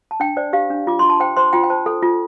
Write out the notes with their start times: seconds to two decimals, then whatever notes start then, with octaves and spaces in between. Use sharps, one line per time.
0.11 A5
0.20 D4 G5
0.37 C5 D5
0.53 G4 F5
0.70 D4
0.87 F4 D6
0.99 F4 C6
1.09 A5
1.20 C5 G5
1.36 C5 C6
1.53 F4 G5
1.64 G5
1.70 C5 A5
1.86 A4
2.03 F4